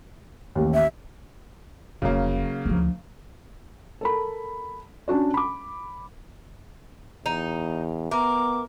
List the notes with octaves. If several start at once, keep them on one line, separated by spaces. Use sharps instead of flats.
A1 D#2
E5
F1 C#3 F#3 A#3
D2 F3
A4 A#4 B5
C#4 D4 F#4 D5
B5 D6
E2 D#4 F7
B3 A#4 E5 A#5 D6